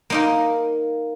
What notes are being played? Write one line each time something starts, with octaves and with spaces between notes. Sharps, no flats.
A#3 D#4 A#4